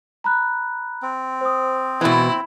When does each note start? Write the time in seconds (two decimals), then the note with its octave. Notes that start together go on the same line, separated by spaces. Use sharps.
0.24 A#5 B5 F#6
1.02 C4
1.41 C5 D#6
2.01 B2 E3 E4